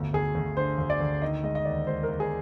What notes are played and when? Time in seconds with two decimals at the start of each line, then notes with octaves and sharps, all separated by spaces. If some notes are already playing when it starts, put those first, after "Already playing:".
Already playing: G1 D2
0.14 D2 G#4
0.35 D2
0.57 D3 C5
0.78 D2
0.90 D5
1.00 D2
1.22 D#3 D#5
1.44 G#3 D#5
1.55 D#5
1.65 D#2 D5
1.86 G#3 C5
2.03 A#4
2.09 D#2
2.20 G#4